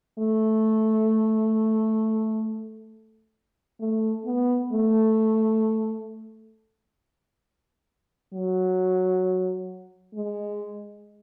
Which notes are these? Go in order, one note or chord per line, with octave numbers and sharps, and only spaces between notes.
A3
A3
B3
A3
F#3
G#3